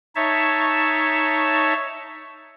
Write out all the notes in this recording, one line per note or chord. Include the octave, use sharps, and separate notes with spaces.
D#4 C#5 E5 A5